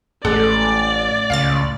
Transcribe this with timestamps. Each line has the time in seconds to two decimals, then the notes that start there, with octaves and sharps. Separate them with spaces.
0.25 A1 A2 G#3 A4 D5 F#5
1.30 C#2 F5 F6 A6